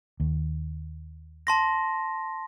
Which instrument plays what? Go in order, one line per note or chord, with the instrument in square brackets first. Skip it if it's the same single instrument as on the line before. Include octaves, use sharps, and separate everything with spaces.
[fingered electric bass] D#2
[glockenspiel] A5 C6 A#6